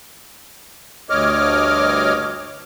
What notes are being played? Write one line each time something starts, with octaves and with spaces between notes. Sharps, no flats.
D2 G2 C#5 D#5 D6 F6